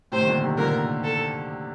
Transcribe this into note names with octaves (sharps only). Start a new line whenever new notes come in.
A2 C3 C5
D#3
A#2 D3
C3 D#3
A#2 D3 A#4
A4